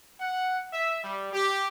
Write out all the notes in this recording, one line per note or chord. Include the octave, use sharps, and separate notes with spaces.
F#5
E5
G3
G4